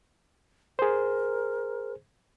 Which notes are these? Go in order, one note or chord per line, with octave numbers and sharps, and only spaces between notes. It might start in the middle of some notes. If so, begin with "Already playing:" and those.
G#4 A#4 C5